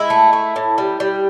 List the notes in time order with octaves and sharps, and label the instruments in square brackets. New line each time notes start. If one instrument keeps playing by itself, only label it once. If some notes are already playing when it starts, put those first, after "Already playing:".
Already playing: [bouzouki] G#3 E4
A3
A3
A2
G3
G3